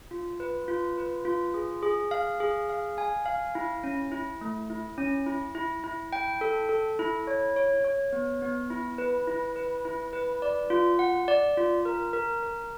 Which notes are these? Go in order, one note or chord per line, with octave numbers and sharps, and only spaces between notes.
F4
B4
F4
B4
F4
G#4
G#4
F5
G#4
F5
G#5
F5
E4
C#4
E4
A3
E4
C#4
E4
E4
E4
G5
A4
A4
E4
C#5
C#5
C#5
B3
B3
E4
B4
E4
B4
E4
B4
D5
F4
F#5
D5
F4
A#4
A#4
A#4